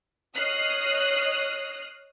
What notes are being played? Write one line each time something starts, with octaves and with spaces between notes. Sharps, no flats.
C#5 D#5 D#6 F6 F#6 C7